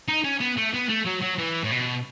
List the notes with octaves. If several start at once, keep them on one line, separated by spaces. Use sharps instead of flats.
D#4
C#4
B3
A3
B3
A3
F#3
F#3
E3
A2
B2